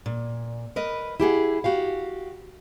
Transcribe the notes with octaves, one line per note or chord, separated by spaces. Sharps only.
A#2
A#4 B4 D#5
E4 G4 G#4 F#5
F#4 G4 F5